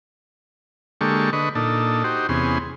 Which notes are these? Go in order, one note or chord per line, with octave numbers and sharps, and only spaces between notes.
D3 G#3 A#3 G4 A4 C#6
D3 B4 D#5 C#6
A#2 D4 D#4 A4
D#4 F#4 G4 C5
E2 C3 B3 C#4 G#4 C6